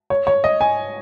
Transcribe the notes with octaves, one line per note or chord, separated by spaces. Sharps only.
C#5
C#5
D#5
G#5